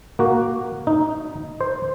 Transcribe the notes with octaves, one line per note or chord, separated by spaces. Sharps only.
A#3 F#4
D#4
C5